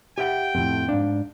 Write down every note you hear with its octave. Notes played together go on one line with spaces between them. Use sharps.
G4 E5 F#5 G5
F2 A2
G#2 D4 F5